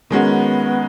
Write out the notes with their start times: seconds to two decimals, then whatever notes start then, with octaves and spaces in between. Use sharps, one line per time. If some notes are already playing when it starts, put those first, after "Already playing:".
0.10 D#3 G#3 B3 C#4 F#4